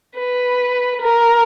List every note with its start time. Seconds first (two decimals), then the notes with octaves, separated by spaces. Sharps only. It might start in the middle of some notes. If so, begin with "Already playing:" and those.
0.18 B4
1.01 A#4